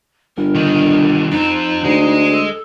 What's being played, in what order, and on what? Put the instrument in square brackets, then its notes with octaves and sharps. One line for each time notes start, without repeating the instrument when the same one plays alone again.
[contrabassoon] G1 [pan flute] A#4
[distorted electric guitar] D3 D#3
[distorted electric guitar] F2 C4 [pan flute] D#4
[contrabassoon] D2 [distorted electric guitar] G#3
[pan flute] A4